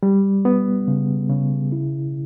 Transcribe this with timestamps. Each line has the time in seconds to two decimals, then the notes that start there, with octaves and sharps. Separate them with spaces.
0.03 G3
0.45 B3
0.88 C#3
1.30 C#3
1.72 E4